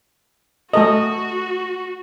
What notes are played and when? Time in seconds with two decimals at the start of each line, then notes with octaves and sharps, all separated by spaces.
0.73 A3 F#4 A4 D#5